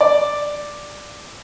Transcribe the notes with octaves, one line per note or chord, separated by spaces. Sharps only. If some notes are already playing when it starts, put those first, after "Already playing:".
D5